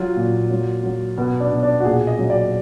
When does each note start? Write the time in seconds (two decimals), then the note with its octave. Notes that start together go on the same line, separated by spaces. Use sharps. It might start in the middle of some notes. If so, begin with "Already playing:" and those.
Already playing: F#3 F4
0.17 A#2
0.50 F#3
0.83 F#3
1.18 B2 B3
1.40 D4
1.51 B2
1.63 D4
1.80 F#4
1.85 A#2 G#4
2.07 D#5
2.19 F#3
2.30 D5